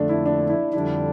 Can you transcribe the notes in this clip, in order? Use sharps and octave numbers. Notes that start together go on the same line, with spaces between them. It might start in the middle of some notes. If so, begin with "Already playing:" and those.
Already playing: F2 D3 A3 D4
E4
D4
E4
F2 D3 G3 D4 E4